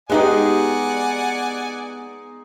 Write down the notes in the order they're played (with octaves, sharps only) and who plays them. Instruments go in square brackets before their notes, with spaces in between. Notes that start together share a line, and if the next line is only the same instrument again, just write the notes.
[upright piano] G#3 D#4 [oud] B3 G4 G#4 [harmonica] D5 F#5 G#5